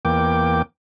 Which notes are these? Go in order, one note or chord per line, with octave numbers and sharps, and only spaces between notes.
E2 A#3 G5 D6